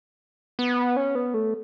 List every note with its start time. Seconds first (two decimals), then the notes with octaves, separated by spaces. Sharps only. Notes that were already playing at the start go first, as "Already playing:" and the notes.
0.59 B3
0.97 C#4
1.15 B3
1.34 A3